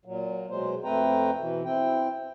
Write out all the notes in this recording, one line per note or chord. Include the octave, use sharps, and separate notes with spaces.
A#2 F#3
B2 F#3 G#3 C5
F2 A3 C4 B4 G5 A#5
B2 E3
C4 E4 G5